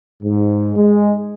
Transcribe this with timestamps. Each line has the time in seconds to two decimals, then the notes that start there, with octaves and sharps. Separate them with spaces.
0.23 G#2
0.76 G#3